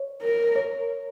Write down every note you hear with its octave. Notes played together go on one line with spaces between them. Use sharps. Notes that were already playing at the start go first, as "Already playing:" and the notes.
Already playing: C#5
A#4
C#5